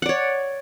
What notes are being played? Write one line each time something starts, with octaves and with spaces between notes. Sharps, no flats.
C#5 D5 F#5